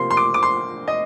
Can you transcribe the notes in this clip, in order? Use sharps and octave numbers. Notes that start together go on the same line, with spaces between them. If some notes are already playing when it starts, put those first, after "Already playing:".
Already playing: C3 F3 A#3 C6
C6
D6
D6
C6
D#5